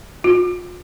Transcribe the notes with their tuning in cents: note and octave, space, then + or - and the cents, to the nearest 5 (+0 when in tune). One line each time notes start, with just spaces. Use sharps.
F4 +40